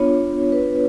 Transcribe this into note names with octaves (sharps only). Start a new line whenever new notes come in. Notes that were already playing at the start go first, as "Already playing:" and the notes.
Already playing: B3 D4 F4 C#5
B4